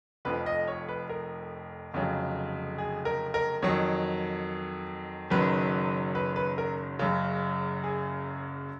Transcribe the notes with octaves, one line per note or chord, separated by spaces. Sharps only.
F1 F2 F3 B4
D#5
C#5
B4
A#4
F1 F2 C#3 F#3
G#4
A#4
A#4
F2 D#3 F#3 C#5
F#1 F#2 D#3 F#3 B4
B4
B4
A#4
F#1 F#2 C#3
G#4